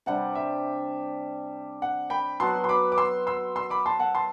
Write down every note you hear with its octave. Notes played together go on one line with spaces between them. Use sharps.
C3 G3 D4 F#5
E5
F#5
G5 B5
F#3 B3 F#4 A5 C6
C6
B5 D6
D6
C6 E6
C6 E6
C6 E6
B5 D6
A5 C6
F#5 A5
A5 C6